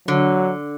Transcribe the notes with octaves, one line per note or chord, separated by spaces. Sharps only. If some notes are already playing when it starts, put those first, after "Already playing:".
D3 F#3